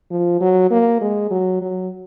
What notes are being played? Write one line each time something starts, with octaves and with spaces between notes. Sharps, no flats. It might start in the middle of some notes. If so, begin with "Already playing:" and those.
F3
F#3
A#3
G#3
F#3
F#3